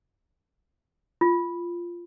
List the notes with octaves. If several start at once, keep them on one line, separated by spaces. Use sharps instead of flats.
F4